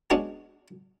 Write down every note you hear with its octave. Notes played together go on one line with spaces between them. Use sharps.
G#3 B3 C#4 D4 F#4 G#4